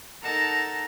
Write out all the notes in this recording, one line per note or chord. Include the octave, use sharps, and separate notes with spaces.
D#4 A4 A#4 F#5 A5 A#5